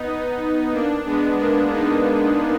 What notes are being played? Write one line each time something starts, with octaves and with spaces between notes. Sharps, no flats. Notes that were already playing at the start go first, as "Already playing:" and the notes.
Already playing: B3 D#4
A#3 D4
G#3 B3
A#3 D4
B3 D#4